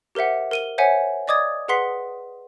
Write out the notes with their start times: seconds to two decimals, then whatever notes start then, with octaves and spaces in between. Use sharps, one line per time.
0.15 G4 A#4 C5 E5 F#5
0.51 A#4 D#7 G7
0.78 C5 C#5 E5 F#5 G#5
1.28 D5 D#5 D6 D#6 G#6 A6
1.68 G#4 B4 F#5 C6 B6 C7